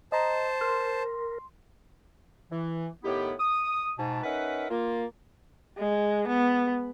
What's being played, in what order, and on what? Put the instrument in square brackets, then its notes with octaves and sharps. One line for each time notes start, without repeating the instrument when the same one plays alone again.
[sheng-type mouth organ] C5 A5 [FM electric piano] D#5 A#5
[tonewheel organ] A#4 [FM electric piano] C6
[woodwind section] E3
A2 D#3 B3 E4 G4
D#6
G#2 B2 A5
C#4 D#4 A#4 B4 E5 F#5
A#3 F4
[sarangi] G#3
B3